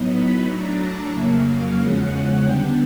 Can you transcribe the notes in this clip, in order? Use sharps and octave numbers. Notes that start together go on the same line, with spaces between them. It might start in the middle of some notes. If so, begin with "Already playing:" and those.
Already playing: A2 F#3 B3 D#4
B5
A2 F#3 A3 D4 A#5
A5
F2 C#3 F#3 A#3 E5
F5
E2 C#3 F3 G#3 C#4 F#5
D3 G3 B3 D4 G5